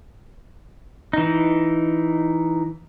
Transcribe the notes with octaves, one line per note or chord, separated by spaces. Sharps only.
E3 D#4